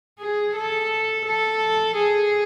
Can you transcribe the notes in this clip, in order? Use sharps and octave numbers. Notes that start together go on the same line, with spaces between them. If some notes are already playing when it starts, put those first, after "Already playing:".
G#4
A4
A4
G#4